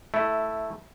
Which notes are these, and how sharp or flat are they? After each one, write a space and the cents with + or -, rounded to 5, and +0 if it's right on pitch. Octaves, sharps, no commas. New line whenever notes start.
A3 +0 E4 -10